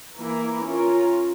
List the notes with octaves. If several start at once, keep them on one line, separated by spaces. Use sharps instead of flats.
E3 A#3 E4 A#4
C#4 F4 A#4